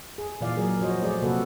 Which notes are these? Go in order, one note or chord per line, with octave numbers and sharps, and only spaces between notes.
G#4
A#2 E3 F4 D5 F5
F#3 G#4 A#4
F3 F#4 C5 C#5 D#5
A3 F4 G#4 D5
C3 A#3 F#4 A4 B4